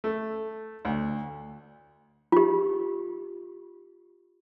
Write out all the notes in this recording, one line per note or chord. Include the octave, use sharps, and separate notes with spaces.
A3
D2
F4 G4